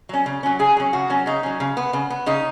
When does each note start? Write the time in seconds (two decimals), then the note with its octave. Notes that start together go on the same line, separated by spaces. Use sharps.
0.09 F#3 C#4
0.26 C#3
0.43 F#3 C#4
0.59 C#3 G#4
0.77 F#3 C#4
0.93 C#3 F#4
1.10 F#3 C#4
1.26 C#3 D#4
1.43 F#3 C#4
1.60 C#3
1.77 B3
1.93 C#3
2.10 B3
2.26 C#3 D#4